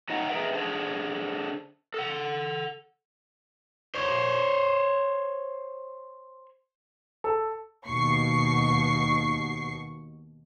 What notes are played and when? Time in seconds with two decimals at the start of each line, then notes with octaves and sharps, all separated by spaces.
0.09 F#3 D#4 D#5 F#5 G5
0.29 G#4 A#4 B4 D#5 E5 G5
0.54 D3 D4 G#4 C5
1.94 A4 F#5
3.95 C5 C#5
7.24 A4
7.87 D#2 B2 C#6 C7